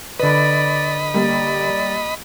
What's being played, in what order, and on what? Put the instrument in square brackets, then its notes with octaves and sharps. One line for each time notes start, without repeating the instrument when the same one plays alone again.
[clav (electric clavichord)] D3 B4 [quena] D5 [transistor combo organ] D#5 B5
[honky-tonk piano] G3 A#3 [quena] D5